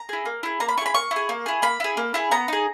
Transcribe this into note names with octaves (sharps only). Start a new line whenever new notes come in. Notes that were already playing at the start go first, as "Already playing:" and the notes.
Already playing: A#5
E4 G#4
A#3
E4 G#4
A#3 A#5
B5
E4 G#4 B5 C#6
A#3 C#6
E4
G#4
A#3
E4 G#4
A#3 B5
E4 G#4
A#3
E4 G#4
B3 A#5
D#4 G#4